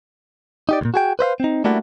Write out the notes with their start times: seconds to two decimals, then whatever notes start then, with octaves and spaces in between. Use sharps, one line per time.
0.69 D#4 G4 D5
0.81 C#2 A#2
0.94 F#4 G#4 G5
1.19 B4 C5 E5 F5
1.40 C4 D#4
1.64 G3 A3 A#3 D4 E4 F#4